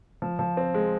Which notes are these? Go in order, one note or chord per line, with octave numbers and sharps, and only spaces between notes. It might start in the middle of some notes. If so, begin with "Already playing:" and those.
F3
F3
C4
G#3